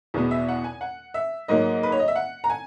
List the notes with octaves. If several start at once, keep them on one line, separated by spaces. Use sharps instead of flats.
E2 B2 G#3 B3 G#4
E5
F#5
G#5
F#5
E5
G#2 F#3 A#3 D#5
B4
C#5
D#5
E5
F#5
A#5
G#5